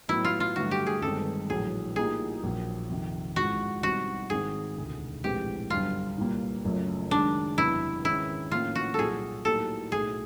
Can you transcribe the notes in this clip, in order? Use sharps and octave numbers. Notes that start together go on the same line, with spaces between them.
A2 F#3 B3 E4
F4
F4
G2 D3 F#3 A3 F#4
G4
G#4
G1 G2 D#3 G#3 C4 A4
A#1 A2 F#3 G#4
A2 F3 A#3 D#4 G4 G#4
A#1 A#2 F#3 A#3
F2 C3 D#3
A1 G#2 F3 G#3 F#4
B2 G3 C4 D#4 F#4
G#1 G#2 D#3 G#3 C4 G#4
E1 D2 C3
A#1 A2 E3 G#3 C4 G4
G1 F#2 D3 G3 F4
C2 A#2 G3 A#3
F#1 F#2 C#3 F3 A3
F#2 D#3 G#3 D4
F#1 E2 C3 E4
G#1 G#2 D#3 G#3 C#4 E4
A2 F3 A#3 C#4 F4
F#4
C2 A#2 F#3 G#4 A4
A2 F#3 A#3 D#4 G4 A4
B1 A2 F#3 A3 G#4